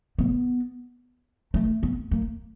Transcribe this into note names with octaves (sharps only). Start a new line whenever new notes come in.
B3
A3
B3
A#3